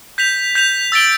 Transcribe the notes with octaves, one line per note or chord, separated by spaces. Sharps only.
G6 B6 F7
G6 B6 F7
E6 A6 D7 G7